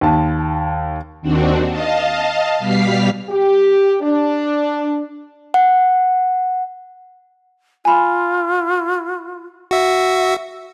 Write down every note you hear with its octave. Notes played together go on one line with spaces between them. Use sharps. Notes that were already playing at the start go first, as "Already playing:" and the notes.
D#2 A5
D#2 D#3 C4 D4 F#4
D#5 F5 A5
B2 G3 F5 F6 B6 C7
G4
D4
F#5
F4 G#5 B5
F#4 E5